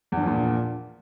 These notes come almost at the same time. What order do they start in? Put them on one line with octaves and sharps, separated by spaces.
E2 G2 F3 A#2